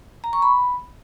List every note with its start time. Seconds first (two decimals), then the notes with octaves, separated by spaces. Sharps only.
0.24 A#5
0.33 C#6
0.42 B5